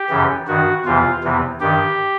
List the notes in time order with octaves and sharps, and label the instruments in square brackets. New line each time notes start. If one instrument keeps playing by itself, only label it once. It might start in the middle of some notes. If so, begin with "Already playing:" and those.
Already playing: [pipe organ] G4
F#2 C#3 E3
G2 D#3 F#4
E2 C3 E3 F4
E2 C3 E3
G2 D#3 G4